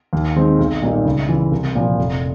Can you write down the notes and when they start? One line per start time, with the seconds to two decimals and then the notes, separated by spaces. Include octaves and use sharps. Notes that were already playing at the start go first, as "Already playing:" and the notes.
0.13 D#2
0.36 D#3 G#3 C4
0.59 B1
0.82 A#2 G3 A#3 D#4
1.05 C#2
1.29 C#3 E3
1.52 C2
1.75 A#2 F3
1.98 F1